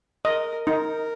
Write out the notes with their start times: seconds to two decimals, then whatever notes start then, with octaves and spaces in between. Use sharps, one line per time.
0.25 A#4 D#5
0.66 D#4 A#4